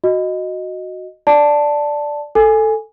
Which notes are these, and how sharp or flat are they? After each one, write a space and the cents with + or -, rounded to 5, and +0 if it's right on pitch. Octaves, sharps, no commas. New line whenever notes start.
F#4 -5 D#5 +0
D5 +0 A5 +0
A4 +0 G#5 +0